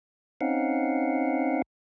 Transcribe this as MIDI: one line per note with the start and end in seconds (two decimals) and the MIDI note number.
0.41 1.62 60
0.41 1.62 61
0.41 1.62 63
0.41 1.62 77
0.41 1.62 78